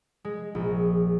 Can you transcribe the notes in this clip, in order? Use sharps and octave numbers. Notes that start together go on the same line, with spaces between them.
G#3
A#1